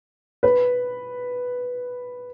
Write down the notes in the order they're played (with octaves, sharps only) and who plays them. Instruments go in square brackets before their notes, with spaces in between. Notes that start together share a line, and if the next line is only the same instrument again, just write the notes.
[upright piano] B4